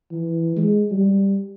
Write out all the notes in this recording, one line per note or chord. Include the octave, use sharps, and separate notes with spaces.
E3
G#3
G3